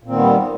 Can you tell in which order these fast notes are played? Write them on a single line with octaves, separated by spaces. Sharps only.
A#2 C4 D#3 B3 G3